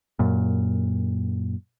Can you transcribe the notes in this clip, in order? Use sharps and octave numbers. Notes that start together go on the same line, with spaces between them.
F#2 A#2